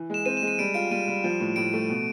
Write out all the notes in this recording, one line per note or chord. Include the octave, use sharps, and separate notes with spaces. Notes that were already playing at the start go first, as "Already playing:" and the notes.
Already playing: E3
G#3 E7
C4 D#7
E7
G#3
D#7
G3 D7
F4 D7
G3 D#7
G3
F3
A2
A2 D7
A3
B2